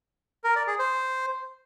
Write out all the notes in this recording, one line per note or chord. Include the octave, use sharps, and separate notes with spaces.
A#4
D5
G#4
C5